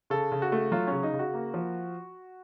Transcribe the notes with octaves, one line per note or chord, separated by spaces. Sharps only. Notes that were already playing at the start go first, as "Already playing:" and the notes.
C#3 A4
C#3
F#4
A3
F#3 F4
C#3 C#4
D#4
C#3
F#4
A#3
F3